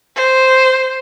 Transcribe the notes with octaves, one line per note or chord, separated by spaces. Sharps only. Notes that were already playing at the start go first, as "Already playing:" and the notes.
C5